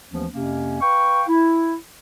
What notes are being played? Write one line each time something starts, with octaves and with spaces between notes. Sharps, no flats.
D#2 E3 F3 A3 B3 C#4
F2 C3 A#3 C#4
B4 F5 G5 C#6
E4